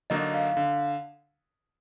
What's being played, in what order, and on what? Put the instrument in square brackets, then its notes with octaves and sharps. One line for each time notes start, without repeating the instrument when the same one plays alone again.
[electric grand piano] D3 F#3 A#3 D#4 [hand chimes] D#5
[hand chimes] F5
[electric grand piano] D3 [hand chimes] F5